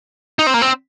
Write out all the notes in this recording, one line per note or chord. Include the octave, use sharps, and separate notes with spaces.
D#4
C4
A#3
C4